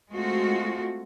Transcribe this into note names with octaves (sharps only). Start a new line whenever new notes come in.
G#3 A3 C4 F4 F#4